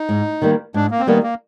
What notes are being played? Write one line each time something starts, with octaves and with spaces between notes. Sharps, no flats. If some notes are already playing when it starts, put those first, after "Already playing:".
Already playing: D#4
G#2
D#3 G3 A#3
G#2 D4
A#3
C4
D#3 G3 A#3 B3
A#3